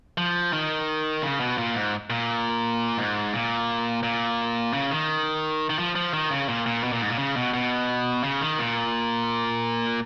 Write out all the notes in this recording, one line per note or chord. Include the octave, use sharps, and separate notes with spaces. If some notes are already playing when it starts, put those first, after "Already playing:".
F3
D#3
C#3
B2
A#2
G#2
A#2
G#2
A#2
A#2
C#3
D#3
D#3
F3
F3
D#3
C#3
A#2
A#2
B2
A#2
G#2
A#2
C#3
B2
B2
C#3
D#3
A#2